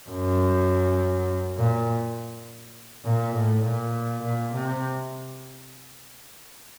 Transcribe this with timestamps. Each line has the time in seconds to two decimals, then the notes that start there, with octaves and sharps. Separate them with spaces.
0.10 F#2
1.58 A#2
3.05 A#2
3.36 A2
3.64 A#2
4.23 A#2
4.54 C3